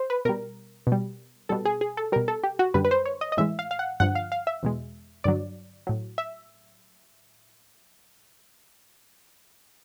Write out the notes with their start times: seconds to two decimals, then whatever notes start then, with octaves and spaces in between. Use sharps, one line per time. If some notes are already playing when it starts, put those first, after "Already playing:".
Already playing: C5
0.10 B4
0.25 B2 G3 A#4
0.87 B2
0.92 G3
1.49 B2 G3 A4
1.65 G#4
1.81 G#4
1.97 A4
2.12 B2 G3 A#4
2.28 A4
2.43 G4
2.59 F#4
2.74 F#2 D3 G3 B4
2.85 B4
2.91 C5
3.05 C#5
3.21 D#5
3.32 D#5
3.37 A2 E3 G#3 E5
3.59 F5
3.71 F5
3.79 F#5
4.00 G2 D3 F3 F#5
4.15 F5
4.32 F5
4.47 E5
4.63 E2 B2 G#3
5.24 G2 D3 F#3 D5
5.87 A2 F#3
6.18 E5